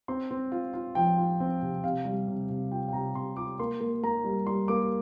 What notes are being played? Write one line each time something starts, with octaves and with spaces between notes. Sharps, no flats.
C4 C6
C4
F4
F4
F3 G5
F4
C4
C3
C3 F5
G3
C3
C3
F4 G5
G5
C3 A#5
C3 C6
F4 D6
A#3 C6
A#3
A#3 A#5
G3
G3 C6
A#3 D6